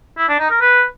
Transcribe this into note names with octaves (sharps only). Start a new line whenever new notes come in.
E4
D4
D#4
A#4
B4